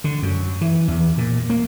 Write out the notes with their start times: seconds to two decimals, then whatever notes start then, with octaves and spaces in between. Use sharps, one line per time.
0.04 D3
0.22 F#2
0.61 E3
0.88 E2
1.18 A#2
1.50 A#3